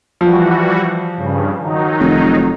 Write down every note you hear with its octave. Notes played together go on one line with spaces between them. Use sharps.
E3 F3 G3 F#4
G2 C#3
D#3 F#3 D#4
F1